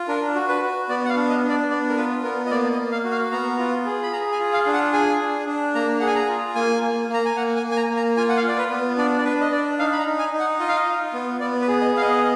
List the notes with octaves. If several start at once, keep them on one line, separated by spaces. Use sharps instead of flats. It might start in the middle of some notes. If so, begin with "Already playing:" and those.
Already playing: F4
D4 A#4
F#4
B4
F#4
B3 D5
F#5
F5
D4
D#5
D4
D5
B3 D5
A#4
F4 B4
B3 A#4
D#5
A#3 D5
D#5
A#3
F5
F#4
F5
B3 A#5
F4
G#4
B5
G#4 A#5
G#5
F4
F5
D4
F#5
G#4 G#5
D4
D4
A#3 A#5
G#4 F#5
G#5
A#5
F4
A#3 G#5
A#3
A#3
A#5
G#5
A#3 F#5
G#5
A#3
G#5
A#5
A#3
A#5
F4 G#5
F#5
F5
F4 D5
B4
B3
D4 D5
D5
D4 B4
D#5
D4 D5
D#4 F5
B5
A#5
D#4
G#5
D#4
F#5
F4 D#5
F5
D#5
F4
B3
B3 D5
B4
G#4
D#5
B3 F5
D#5